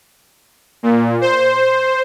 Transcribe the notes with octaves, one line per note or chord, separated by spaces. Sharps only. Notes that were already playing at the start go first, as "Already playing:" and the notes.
A#2
C5